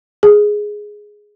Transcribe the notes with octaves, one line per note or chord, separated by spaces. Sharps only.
G#4